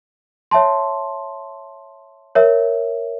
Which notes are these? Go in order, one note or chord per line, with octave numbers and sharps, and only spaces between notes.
C#5 E5 A5 C6
A#4 C#5 E5